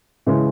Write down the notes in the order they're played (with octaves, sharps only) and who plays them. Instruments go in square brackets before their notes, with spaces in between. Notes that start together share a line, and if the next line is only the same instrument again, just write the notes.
[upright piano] C#3 E3 G#3